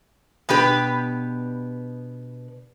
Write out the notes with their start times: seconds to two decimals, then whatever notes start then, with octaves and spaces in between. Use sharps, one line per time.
0.49 B2 B3 D4 G4 B4